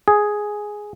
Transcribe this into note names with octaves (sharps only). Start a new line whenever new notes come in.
G#4